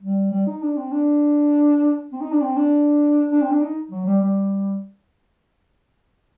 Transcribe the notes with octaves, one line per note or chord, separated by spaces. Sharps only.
G3
G3
D#4
D4
C4
D4
C4
D#4
D4
C4
D4
D4
C4
D4
D#4
F#3
G3
G3